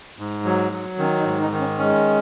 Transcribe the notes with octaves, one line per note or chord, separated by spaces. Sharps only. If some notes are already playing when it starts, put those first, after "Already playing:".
G#2
F#3
F#3
D#3 C#4
D#4
G#2
D#4
D#3
C#4
G#3 C#4